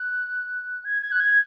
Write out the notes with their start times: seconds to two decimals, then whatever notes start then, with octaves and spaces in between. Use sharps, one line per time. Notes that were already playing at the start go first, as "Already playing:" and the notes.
Already playing: F#6
0.85 G#6
1.02 G#6
1.12 F#6
1.20 G#6